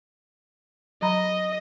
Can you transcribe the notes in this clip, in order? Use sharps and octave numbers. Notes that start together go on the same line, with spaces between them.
F#3 D#5 A#5 B5